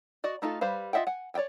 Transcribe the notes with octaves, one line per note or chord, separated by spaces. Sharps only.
F#4 D5 D#5
A3 D#4 F4 A4
G3 B4 C5 F5
F4 D#5 E5 F#5 G5
F#5 G#5
C#5 D5 E5 G5 G#5